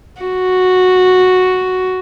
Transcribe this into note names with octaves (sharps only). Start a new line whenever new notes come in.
F#4